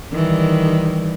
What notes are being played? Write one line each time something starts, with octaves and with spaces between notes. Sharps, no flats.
D#3 E3 G3